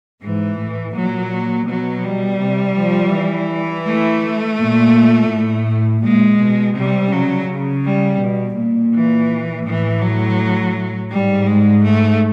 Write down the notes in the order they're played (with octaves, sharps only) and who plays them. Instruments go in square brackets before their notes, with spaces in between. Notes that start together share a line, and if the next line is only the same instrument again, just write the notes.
[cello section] G#2 [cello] E3
[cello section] A2
[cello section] A#2 [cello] F#3
[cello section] B2 [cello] F#3
[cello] G3
[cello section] C3
F3
E3
[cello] A3
[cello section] A#2
A2
[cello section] A#2 [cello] G#3
[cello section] B2
[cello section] C3 [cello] G3
[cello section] C#3 [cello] F#3
[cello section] C#3
[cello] G3
[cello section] B2
A#2
[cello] E3
[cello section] A2 [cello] E3
[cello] F#3
[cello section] G#2 [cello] G3
[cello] G#3
A3